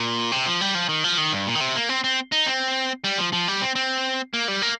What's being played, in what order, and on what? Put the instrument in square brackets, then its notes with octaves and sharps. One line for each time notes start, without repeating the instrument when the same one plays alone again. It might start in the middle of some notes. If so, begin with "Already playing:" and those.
Already playing: [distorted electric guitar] A#2
C3
F3
G3
F3
D#3
F3
D#3
G2
A#2
D#3
C3
A#3
C4
C4
D#4
C4
G3
F3
F3
G3
C4
C4
A#3
G3
A#3